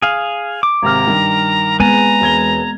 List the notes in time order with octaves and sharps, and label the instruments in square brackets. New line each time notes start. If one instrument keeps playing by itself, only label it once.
[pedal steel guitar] G#4 F5
D6
[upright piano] G#1 C3 F6 [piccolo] A#5
[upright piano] G2 D#3
[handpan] G#3 B3 C4 [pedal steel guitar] B4 G#5 [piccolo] A#5 [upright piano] A6
[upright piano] E1 G#6 G7